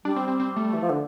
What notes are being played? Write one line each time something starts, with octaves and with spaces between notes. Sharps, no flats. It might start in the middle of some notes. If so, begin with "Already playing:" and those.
G3 D4
C4
C4
C4
A3
E3
F3
D3